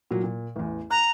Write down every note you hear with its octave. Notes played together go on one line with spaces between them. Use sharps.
A#2 F#3
A#2
A1 E2
A#5 F#6